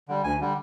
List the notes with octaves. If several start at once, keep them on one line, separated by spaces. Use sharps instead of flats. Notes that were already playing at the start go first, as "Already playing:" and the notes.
D3 G3
D2 G#5
D3 G3